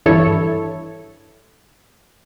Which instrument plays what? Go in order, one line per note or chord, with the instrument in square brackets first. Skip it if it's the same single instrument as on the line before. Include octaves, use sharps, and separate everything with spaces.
[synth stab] G#1 G2 E3 E4 A4 C#5